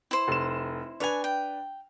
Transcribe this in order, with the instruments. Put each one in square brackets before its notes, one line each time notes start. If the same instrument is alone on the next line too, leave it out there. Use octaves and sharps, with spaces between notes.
[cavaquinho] E4 C5
[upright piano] F1 E7
[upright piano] D4 B4 F7 [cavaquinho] C#5 G#5
[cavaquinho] G5